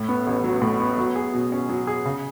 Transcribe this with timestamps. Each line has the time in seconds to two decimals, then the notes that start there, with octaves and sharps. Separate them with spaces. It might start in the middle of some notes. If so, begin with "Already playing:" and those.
Already playing: A2
0.08 B3
0.27 A1
0.44 F#3
0.62 A2
0.80 B3
0.98 F#3
1.16 G#4
1.34 B2
1.52 C#4
1.69 F#3
1.87 G#4
2.05 C#3